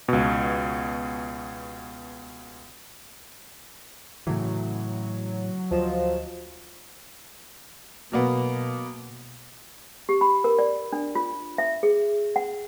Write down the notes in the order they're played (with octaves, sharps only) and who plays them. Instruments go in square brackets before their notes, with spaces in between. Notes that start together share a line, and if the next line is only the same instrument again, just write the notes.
[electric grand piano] C#2 B2
[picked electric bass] A2 E3 [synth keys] C#3 [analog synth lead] F#3
[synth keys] D2 D#5 E7 [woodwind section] F3
[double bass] B2 [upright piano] F#3 A#3 B3
[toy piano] G4
B5
A#4
D5
D4
F4
E5
G#4
F#5